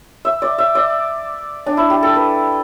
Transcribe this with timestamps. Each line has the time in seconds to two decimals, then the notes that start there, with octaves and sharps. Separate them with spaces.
0.25 E5
0.42 D5
0.58 E5
0.75 D5
1.66 D4
1.77 E4
1.90 G4
2.03 A4
2.15 B4